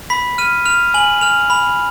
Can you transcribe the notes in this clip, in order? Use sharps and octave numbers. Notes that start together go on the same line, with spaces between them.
B5 B6
F6 D#7
F6 F7
G#5 F#7
F6 F7
B5 F7